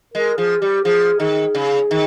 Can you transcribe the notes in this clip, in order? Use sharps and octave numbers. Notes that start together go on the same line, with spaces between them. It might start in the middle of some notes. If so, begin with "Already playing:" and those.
G#3 A#4
F3 G#4
G3 G4
F3 G#4
D#3 G#4
C#3
D#3